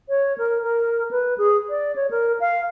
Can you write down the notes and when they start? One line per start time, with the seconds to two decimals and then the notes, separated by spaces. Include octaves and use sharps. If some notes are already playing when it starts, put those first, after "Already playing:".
0.09 C#5
0.38 A#4
0.63 A#4
1.11 B4
1.38 G#4
1.69 D5
1.96 C#5
2.11 A#4
2.40 F5